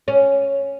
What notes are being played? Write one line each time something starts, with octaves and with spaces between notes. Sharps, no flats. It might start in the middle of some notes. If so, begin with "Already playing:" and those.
C#4